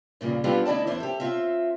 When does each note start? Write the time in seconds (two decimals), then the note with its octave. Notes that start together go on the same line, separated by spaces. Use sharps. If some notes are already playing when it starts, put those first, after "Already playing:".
0.21 G2 A#2 C#3
0.44 G3 B3 D4 F4 G4 A4
0.65 D2 D#4 E4 D5 A5
0.87 E2 D4 C5 E5
1.00 G4 A4
1.20 C4 F4 E5